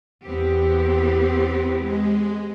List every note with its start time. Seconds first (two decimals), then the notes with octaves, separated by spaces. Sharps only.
0.25 E2 B3 C4 G4
1.76 G#3